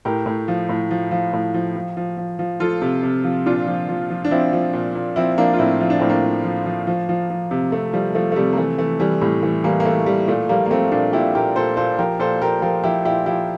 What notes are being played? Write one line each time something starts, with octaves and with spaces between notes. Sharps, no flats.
A2 G4 A#4
A2
F3
A2
F3
F3
A2
F3
F3
F3
F3
F3
F3 F4 A4
C3
C3
F3
A#2 D4 F4
F3
F3
F3
D4
F3 C4 E4
F3
A#2
A#2
F3 C4 E4
F3 A#3 D4
F4
A2 C4 E4
F3 E4
D4
A2 C4
A#3 D4
F3
F3
F3
F3
F3
F3
C3
C3 A3
F3 G3
F3 A3
A3
C3 G3
A#3
E3 A3
E3 A3
E3 G3
A2 G3
E3 A3
E3 G3 A#3
A#3
E3 A3
E3 G3
A#2 A3
F3 G3 A#3
A#3
F3 A3 C4
A#2 A#3 D4
A#2 E4 G4
A#2 G4 A#4
A#2 A4 C5
A#2 A4 C5
F3 G4 A#4
A#2 A4 C5
A#2 G4 A#4
F3 G4 A#4
F3 E4 G4
A#2 E4 G4
F3 E4 G4